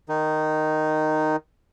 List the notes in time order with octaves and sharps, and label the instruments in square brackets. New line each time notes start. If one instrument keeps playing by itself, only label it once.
[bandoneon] D#3 D#4